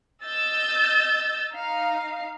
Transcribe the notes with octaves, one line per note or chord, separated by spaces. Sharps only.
D#5 E6 G6 A6
D#4 F5